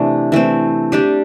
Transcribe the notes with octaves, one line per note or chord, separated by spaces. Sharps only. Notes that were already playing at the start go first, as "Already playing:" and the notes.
Already playing: C3 E3 A3 D4
E3 A3 C4
G3 D4 G4